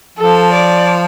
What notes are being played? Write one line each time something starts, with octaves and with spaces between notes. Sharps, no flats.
F3 A4
D5